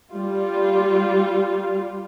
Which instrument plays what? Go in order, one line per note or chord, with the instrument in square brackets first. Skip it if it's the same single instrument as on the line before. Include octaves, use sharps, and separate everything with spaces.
[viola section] G3 F4